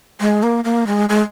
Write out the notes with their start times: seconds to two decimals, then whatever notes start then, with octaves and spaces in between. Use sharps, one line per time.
0.20 G#3
0.43 A#3
0.64 A#3
0.87 G#3
1.09 G#3